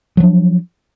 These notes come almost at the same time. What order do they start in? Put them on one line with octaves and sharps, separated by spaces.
F#3 F3 D4